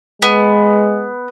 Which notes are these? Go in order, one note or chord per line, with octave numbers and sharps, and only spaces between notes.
G#3 B3